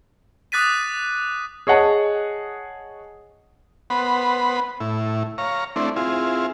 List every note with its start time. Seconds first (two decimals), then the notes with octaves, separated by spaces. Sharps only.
0.52 D6 D#6 F#6 A6 B6 D#7
1.67 G#4 C#5 D#5 F#5 A5
3.90 B3 C5 F#5 B5
4.80 A2 E4
5.38 C#5 F5 A#5
5.76 A3 C4 D4 E4
5.96 C4 E4 F4 G#4